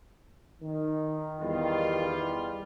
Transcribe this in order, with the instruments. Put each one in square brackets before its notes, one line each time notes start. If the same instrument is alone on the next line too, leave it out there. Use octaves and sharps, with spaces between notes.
[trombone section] D#3
[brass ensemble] E2 G3 F4